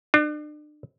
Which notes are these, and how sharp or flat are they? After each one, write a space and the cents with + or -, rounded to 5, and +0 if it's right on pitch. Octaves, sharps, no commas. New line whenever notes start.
D4 +35